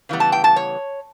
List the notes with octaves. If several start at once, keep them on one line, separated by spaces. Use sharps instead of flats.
C#3 E3 G3 B3
A5
G5
A5
C#5